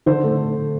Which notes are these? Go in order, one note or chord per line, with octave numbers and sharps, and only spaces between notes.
D3 C5
A3